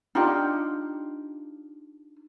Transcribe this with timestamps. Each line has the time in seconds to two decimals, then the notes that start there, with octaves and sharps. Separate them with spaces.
0.15 D4 D#4 F4 G4